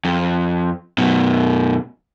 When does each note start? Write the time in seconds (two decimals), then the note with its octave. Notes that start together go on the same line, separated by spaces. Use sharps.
0.05 F2
0.98 F#2 B2